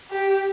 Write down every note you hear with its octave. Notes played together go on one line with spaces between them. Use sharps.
G4